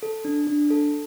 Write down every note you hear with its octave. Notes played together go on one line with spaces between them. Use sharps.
A4
D4
D4
A4